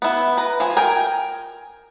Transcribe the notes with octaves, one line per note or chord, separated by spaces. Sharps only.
B3 E4
B4 A#5
F3 G#5
A#4 G5 G#5